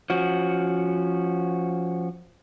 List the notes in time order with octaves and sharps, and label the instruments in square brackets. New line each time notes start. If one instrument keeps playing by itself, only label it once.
[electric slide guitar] F3 C#4 F#4